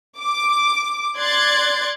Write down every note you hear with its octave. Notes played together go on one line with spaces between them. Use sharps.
D6
D5 C6 F#6 G#6 A6